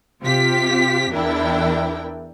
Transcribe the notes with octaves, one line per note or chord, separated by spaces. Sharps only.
C3 F4 G4 B6
E2 D4 E4 A#4 G5